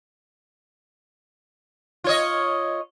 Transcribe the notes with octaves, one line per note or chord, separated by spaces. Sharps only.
F4 C#5 D#5